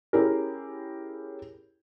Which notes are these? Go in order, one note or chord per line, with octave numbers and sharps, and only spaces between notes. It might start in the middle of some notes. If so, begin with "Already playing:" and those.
C#4 E4 G4 G#4 A#4